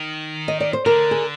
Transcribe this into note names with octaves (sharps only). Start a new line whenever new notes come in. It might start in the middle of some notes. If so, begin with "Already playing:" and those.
Already playing: D#3
D#5
D5
C5
D3 A#4
G#4